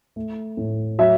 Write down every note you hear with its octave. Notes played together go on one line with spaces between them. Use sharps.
A3
A2
F#3 E5